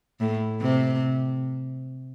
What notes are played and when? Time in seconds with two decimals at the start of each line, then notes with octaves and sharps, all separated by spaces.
0.20 A2
0.62 C3